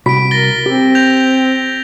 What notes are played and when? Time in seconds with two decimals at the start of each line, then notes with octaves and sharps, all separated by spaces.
0.06 C2 F#4 B5 B6 D7
0.31 A#4 A6 A#6 G7
0.66 C4 G4
0.95 G6 A#6 F7